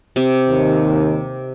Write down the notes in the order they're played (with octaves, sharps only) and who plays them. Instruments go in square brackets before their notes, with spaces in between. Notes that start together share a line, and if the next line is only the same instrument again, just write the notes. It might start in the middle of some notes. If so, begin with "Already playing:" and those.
[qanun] C3
[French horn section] D#2 D#3